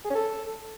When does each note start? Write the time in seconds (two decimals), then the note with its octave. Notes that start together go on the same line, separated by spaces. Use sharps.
0.04 G#4
0.10 C#4
0.15 A4